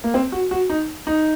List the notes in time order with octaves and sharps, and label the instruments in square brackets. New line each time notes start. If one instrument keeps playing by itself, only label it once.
[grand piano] A#3
C4
F#4
F#4
D#4
D#4